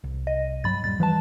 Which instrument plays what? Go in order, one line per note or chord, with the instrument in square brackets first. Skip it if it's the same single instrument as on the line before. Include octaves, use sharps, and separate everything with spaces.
[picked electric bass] C2
[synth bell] D#5
[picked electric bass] G2 [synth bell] F#3 B5 A6
[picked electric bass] D#1 G3 [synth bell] A6
[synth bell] E3 B4 A5 [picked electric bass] F3 G3